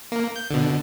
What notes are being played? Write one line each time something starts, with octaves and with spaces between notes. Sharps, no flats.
A#3
G6
B2 D3